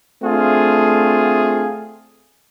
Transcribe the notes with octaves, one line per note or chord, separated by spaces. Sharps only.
A3 C4 D4 F4 G#4